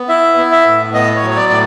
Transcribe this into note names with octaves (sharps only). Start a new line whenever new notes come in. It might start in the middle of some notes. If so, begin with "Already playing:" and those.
Already playing: B3
E4 E5
B3
E5
A2
B3 D#5
C#5
F#3
C#5
D5
A2 D5